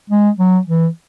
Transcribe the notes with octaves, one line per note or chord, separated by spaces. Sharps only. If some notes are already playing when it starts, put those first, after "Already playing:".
G#3
F#3
E3